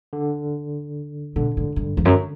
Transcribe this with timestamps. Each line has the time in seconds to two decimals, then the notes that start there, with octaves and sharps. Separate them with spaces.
0.13 D3
1.36 B2 D3
1.57 A2
1.76 G2
1.97 E2
2.05 F#2